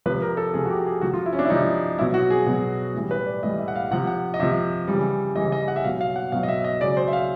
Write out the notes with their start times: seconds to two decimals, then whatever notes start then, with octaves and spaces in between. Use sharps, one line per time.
0.06 C3 F3 B4
0.22 A#4
0.37 A4
0.54 C3 F3 G#4
0.65 F#4
0.70 G4
0.87 G#4
1.01 C3 F3 F#4
1.13 F4
1.26 E4
1.33 C#4
1.39 D4
1.45 E4
1.50 C3 F3 D#4
1.99 B2 F#3 E4
2.14 F#4
2.30 G#4
2.46 B2 F#3
2.95 A2 E3 G3
3.11 B4
3.26 D5
3.43 A2 E3 G3 D#5
3.59 E5
3.68 F#5
3.76 F5
3.91 C3 F3 F#5
4.07 F#5
4.34 D#5
4.40 C3 F3 E5
4.88 C#3 E3 G3
5.35 C#3 E3 G3 D#5
5.52 D#5
5.68 F#5
5.76 E5
5.84 B2 F#3 F5
6.01 F5
6.16 F#5
6.32 B2 F#3 F5
6.43 D#5
6.48 E5
6.64 D#5
6.80 C#3 D5
6.84 F#3
6.97 C5
7.08 E5
7.13 F5